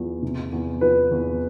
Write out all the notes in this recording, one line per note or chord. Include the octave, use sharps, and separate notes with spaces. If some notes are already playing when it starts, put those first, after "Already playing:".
Already playing: E2 F3
C3
E2
F3 B4
E2